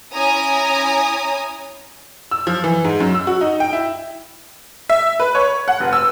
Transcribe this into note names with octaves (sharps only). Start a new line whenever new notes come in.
C#4 E4 G#5 A#5 D#6
E6
F3
E3
G#2
F#2
E6
F#4
D#4
G5
E4
E5
B4
C#5
F#5
F1
E6